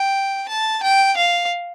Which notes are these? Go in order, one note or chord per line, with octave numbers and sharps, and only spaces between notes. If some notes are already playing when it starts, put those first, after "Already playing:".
Already playing: G5
A5
G5
F5